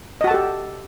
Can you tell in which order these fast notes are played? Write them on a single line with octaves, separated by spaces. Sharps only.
D#5 F#4 A5 A4 G4